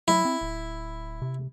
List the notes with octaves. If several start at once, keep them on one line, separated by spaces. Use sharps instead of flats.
F#3 E4
C4
D1
C3